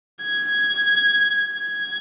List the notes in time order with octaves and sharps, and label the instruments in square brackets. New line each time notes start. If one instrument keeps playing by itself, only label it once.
[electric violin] G#6
G#6